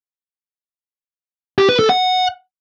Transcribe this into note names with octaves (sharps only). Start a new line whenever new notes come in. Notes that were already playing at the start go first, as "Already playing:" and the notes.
G4
B4
A4
F#5